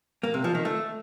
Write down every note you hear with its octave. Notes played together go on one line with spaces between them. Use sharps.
A#3
C3
F3
D#3
A3